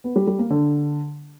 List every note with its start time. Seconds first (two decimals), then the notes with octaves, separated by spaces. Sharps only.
0.04 B3
0.16 G3
0.27 G3
0.39 A#3
0.50 D3